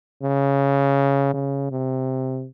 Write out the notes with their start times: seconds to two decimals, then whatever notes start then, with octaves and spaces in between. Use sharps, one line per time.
0.23 C#3
1.34 C#3
1.71 C3